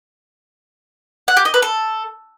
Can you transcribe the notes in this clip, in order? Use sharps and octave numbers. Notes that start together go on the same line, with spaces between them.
F#5
G4
D#5
B4
A4